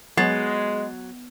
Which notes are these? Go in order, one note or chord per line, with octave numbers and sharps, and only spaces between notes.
F#3 G#3 B3 A6 C7